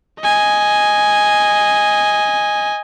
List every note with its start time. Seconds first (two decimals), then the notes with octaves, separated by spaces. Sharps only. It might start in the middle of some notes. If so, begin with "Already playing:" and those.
0.21 D#5 G#5